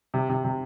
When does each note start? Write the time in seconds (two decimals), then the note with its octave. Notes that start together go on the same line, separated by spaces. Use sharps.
0.14 C3
0.29 C3
0.44 C3